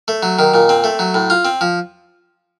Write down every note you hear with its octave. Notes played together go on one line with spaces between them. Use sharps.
A3
F#3
D#3
A#2
C4
A3
F#3
A2
F4
C4
F3